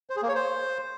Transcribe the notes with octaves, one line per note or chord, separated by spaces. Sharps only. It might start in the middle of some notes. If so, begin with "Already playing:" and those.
C5
G#4
A#3
C#5
C5